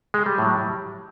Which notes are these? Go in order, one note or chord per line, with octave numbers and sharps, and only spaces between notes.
G#3
G3
A2 F#3